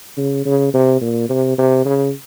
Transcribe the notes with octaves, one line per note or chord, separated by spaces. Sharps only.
C#3
C#3
C3
A#2
C3
C3
C#3